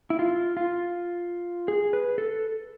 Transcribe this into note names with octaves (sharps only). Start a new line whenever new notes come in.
E4
F4
F4
G#4
B4
A4